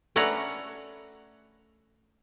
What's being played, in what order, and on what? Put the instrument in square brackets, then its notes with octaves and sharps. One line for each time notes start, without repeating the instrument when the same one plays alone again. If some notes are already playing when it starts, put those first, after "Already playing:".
[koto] A3 C#4 D4 B4 F#5 A#5